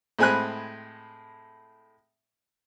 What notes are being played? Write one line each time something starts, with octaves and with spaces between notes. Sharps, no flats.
A2 G#3 C4 G#5 B5 F#6